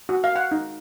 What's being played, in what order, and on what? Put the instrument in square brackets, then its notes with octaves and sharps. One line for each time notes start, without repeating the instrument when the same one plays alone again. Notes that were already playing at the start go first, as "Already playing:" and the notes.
[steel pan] F#4
F5
F#5
D#4